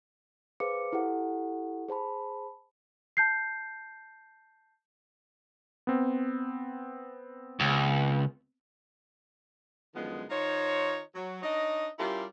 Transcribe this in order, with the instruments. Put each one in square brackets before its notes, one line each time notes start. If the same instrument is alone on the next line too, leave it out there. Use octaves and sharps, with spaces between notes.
[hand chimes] G#4 B4 C5 F5 D6 C#7
E4 G4 A4 F#5
G#4 C5 A5 B5
[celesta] A5 G6 C7
[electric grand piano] B3 C4
[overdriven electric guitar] C#2
[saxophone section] F#2 D3 D#3 F3 G#3 B3
D#3 D#4 F4 C5 C#5
F#3
D4 D#4 C#5 D#5
G3 C#4 E4 F4 G4 A#4